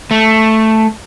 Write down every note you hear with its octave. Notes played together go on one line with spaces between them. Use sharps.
A3